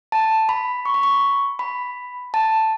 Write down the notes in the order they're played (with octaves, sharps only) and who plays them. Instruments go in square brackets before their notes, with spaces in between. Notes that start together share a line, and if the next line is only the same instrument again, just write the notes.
[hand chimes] A5
B5
C#6
B5
C#6
B5
A5